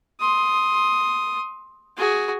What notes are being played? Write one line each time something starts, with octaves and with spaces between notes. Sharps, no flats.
C6 D#6
F#4 G#4